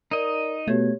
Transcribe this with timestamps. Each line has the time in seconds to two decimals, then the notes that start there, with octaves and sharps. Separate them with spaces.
0.11 D#4 A#4 D5 D#5
0.68 B2 A3 G4 C#5 G#6